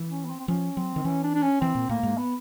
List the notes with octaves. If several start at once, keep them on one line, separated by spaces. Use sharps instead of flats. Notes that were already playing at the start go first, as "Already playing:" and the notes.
Already playing: E3
C#4
B3
C4
C4
F3 C#4
F#3 C4
D#3
E3 C#4
D4
D4
C#4
E3 C4
A#2
A2 A#3
G#2
B3